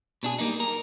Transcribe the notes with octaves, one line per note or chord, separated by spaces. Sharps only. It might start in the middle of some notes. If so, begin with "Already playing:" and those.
B2 D4 G#4
G3 A#3 D4 D#4
A#4